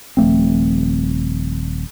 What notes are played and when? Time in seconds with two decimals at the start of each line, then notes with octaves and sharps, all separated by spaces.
0.17 D#1 F3 A3 C4